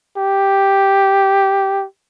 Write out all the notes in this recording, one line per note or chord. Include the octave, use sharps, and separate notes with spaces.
G4